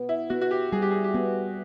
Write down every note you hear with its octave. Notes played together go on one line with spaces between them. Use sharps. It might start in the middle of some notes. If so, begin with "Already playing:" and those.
Already playing: B3
E4
B3 F#4
F#4
G4
G3 G#4
G4
G#4
G4
B3 G#4